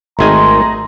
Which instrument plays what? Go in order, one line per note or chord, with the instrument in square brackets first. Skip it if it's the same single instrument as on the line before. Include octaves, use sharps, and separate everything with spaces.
[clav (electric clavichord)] G#1 D#3 G#5 [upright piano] A3 G#4 D#5 [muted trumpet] A#5 [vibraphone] C6